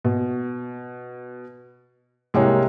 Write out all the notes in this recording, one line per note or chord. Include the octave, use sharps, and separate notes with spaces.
B2
C2 G#3 A#3 G4 C#5